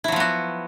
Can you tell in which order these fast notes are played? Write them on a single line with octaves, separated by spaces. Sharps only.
E4 F#3 F3 B3 F#4